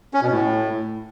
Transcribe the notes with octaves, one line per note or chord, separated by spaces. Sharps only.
C#4
B2
A2